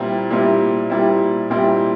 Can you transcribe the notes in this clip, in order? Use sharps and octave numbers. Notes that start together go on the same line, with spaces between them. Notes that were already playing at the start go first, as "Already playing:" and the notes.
Already playing: A#2 G3 C4 E4
A#2 G3 C4 E4
A#2 G3 C4 E4
A#2 G3 C4 E4